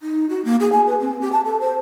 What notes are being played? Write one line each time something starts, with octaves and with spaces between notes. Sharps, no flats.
D#4
F#4
A#3
G#4
G#5
B4
C4
G4
A5
A4
C5